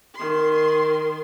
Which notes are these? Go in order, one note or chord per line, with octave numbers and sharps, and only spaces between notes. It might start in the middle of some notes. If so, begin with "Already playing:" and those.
D#3 C6